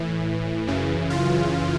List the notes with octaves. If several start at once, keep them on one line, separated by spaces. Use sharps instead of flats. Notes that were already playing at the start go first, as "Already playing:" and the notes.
Already playing: A2 E3
F#2 C#3 E3
F4